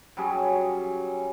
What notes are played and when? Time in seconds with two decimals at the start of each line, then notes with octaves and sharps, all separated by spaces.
0.17 F#3 G3 C#4 G#4